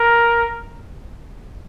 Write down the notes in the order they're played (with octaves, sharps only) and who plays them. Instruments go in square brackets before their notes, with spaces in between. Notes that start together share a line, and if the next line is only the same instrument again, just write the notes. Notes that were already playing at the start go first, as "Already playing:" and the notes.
Already playing: [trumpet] A#4